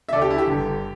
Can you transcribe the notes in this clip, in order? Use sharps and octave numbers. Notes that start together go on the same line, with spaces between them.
E5
D2 D3 G4 A4 D5
E4
G4
G1 G2 D3